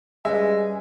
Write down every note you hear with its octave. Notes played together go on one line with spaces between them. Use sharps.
G3 G#3 C#4 B4 E5 G#5